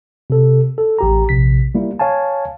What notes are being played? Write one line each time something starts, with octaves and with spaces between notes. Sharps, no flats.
C3 A4
A4
A1 G4 A#5
A#1 C3 B6
G3 A#3 E4
C#5 F5 G#5 A5